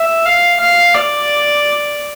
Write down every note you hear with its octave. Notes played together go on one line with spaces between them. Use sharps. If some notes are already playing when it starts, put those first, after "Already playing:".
Already playing: E5
F5
F5
D5